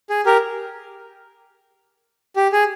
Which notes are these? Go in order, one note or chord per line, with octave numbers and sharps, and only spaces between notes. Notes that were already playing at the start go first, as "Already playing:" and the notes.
G#4
G4 A#4
G4
G#4